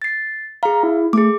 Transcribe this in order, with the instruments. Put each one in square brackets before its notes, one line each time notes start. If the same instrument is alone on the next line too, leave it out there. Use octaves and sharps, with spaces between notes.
[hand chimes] A6 C7
[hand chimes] G#4 F5 [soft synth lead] A#5
[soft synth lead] E4
[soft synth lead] A3 [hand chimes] G#4 D6